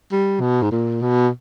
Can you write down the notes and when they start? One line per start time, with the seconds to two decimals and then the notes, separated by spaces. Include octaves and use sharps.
0.12 G3
0.41 B2
0.62 G#2
0.72 A#2
1.02 B2